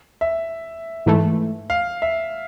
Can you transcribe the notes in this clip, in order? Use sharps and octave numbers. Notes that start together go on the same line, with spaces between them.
E5
G#2 E3 A3
F5
E5